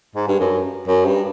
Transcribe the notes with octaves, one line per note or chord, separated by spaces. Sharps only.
G#2
G2
F#2
F#2
G2